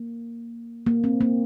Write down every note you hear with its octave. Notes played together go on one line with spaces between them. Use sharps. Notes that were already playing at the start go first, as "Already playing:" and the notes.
Already playing: A#3
A#3
C4
A#3